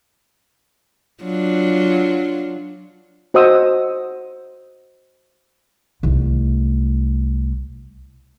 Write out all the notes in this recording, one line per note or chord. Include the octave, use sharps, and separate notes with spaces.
F#3 D4 F4
F#4 C5 D#5 F#5 D#6 E6
C2 A3